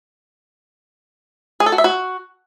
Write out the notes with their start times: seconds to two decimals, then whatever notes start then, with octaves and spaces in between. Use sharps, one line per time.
1.60 G#4
1.66 A4
1.72 F#4
1.78 E5
1.84 F#4